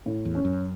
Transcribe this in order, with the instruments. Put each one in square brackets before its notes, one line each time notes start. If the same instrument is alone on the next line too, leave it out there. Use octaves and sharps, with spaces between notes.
[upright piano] A2
[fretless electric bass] E2
[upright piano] C#4
[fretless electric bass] F#2